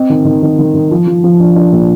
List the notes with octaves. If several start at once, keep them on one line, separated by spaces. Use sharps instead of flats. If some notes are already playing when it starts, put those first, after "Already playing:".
Already playing: C4 D#5
D#3
D#3
D#3
D#3
D#3
F3
F3
F3
D4
D4
A#2